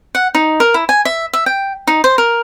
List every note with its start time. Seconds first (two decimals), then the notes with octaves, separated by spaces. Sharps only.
0.15 F#5
0.35 D#4
0.60 A#4
0.74 E4
0.89 G#5
1.05 E5
1.33 E5
1.46 G5
1.87 D#4
2.04 C5
2.18 A#4